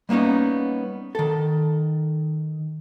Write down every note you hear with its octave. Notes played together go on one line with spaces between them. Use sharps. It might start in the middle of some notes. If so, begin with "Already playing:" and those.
G3 A#3 B3 C#4 D#4
D#3 A4